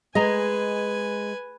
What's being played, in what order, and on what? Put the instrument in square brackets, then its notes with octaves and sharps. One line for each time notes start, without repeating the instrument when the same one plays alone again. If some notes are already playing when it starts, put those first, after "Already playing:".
[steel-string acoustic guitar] G#3 [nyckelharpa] B4 G#5 [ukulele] D#5 A#5